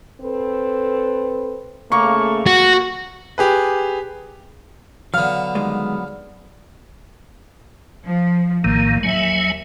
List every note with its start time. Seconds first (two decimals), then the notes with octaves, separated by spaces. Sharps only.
0.22 C4 A4 B4
1.92 C#3 A3 A#3 C#6
2.47 F#4
3.38 G4 G#4 B4
5.14 D3 F#3 B3 F5 F6
5.55 D#3 G3 G#3
8.07 F3
8.64 A#1 A2 D#3 A#3
9.03 D#2 F#3 E5 G#5